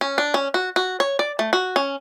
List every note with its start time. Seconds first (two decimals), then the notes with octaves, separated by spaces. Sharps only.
0.01 C#4
0.18 D4
0.34 C#4
0.54 F#4
0.76 F#4
1.00 C#5
1.19 D5
1.39 A3
1.53 F#4
1.76 C#4